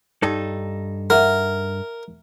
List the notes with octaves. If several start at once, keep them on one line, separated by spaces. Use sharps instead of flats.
G2 D#4 A4
A#4 E5 F#5